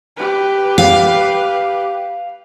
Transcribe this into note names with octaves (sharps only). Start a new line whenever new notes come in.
G4 B4
F5